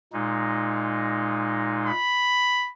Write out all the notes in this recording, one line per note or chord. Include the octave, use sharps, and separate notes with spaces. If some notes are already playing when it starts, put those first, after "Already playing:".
A#2 G#3 D#4
B5